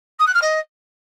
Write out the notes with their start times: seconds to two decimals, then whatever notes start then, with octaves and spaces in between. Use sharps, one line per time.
0.19 D#6
0.27 F#6
0.34 F6
0.42 D#5